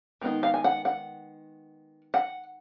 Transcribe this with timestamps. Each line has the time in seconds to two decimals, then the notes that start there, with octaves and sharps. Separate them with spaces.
0.21 D#3 G#3 B3 D#4
0.43 F5
0.54 G#5
0.64 F#5
0.85 F#5
2.14 F#5